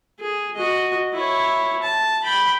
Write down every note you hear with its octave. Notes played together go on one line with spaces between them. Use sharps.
G#4
F#4 D#5
E4 C#5
A5
G5 B5